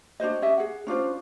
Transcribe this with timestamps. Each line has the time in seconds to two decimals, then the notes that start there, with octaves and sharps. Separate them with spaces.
0.20 D4 F#4 C5 D#5
0.42 C#4 G4 D#5 E5
0.58 G#4 F#5
0.87 C#4 D4 F4 C5